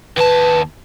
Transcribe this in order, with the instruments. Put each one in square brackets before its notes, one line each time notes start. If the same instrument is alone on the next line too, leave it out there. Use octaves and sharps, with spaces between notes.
[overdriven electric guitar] D#2 A5 [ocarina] B4